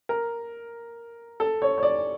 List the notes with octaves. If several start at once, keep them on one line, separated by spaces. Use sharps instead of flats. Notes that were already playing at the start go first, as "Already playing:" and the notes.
A#4
A4
C#5
C#5
D5